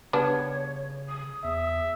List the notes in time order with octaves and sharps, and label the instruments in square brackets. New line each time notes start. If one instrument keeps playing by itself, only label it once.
[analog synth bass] C#3 [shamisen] G3 B3 D4 [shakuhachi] C#5
[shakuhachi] D#6
[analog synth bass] E2 [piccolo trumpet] E5